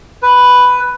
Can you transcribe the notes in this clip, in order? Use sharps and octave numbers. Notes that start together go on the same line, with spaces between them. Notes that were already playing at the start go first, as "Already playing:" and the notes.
B4